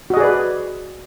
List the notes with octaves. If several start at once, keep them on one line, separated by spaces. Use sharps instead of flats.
F#4 G#4 B4 D5 D#5